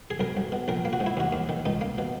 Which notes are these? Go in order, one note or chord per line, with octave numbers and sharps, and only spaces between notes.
G#4
B1 A#4
B1
B2
A#1 A#4
A#3
F#4
G#2
E4
D#2 F#4
D#2
D#3
C#2 D#4
A#3
B2